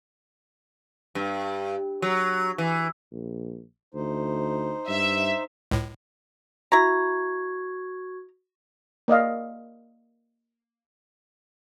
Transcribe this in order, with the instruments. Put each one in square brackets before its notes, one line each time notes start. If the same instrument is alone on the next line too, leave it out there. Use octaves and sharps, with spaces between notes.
[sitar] G2
F#3
E3
[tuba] A#1
[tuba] D2 [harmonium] D#4 C5
[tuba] G2 [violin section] E5
[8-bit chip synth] C#2 A2
[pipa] E4 A#5 [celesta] F#4 C#6 G#6
[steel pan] A#3 D5 D#5 F5